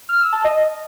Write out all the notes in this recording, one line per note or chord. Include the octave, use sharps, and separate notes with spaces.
F6
E6
A5
D#5